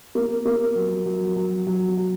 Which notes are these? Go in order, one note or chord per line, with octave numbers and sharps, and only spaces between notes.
A#3
A#3
F#3
F#3
F#3
F#3
F#3